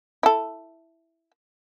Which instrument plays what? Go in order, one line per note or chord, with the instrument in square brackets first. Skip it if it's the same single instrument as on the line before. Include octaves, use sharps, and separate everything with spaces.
[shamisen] E4 A4